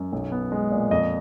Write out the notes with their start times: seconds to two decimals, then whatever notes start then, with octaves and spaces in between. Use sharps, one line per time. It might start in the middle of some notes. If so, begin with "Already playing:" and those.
Already playing: F#2
0.12 B1
0.32 B3
0.52 G#3
0.71 A#2
0.91 F2 D#5